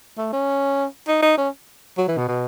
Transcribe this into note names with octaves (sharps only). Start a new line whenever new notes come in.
A3
C#4
D#4
D#4
C#4
F#3
E3
B2
B2